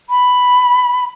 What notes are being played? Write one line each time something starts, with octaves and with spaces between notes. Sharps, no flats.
B5